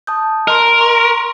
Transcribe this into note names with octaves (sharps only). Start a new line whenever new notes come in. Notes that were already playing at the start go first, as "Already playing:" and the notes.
A5 D#6 G6
A#4 D#5 C6
A#5 C6 C#6